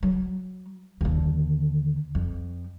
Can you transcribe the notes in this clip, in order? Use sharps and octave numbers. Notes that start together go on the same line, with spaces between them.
F#3
D#2 D3
F2